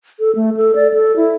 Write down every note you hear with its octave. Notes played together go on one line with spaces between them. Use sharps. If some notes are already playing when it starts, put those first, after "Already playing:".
A4
A3
A4
D5
A4
E4